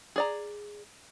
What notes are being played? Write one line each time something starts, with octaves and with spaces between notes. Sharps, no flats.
G#4 D5 A#5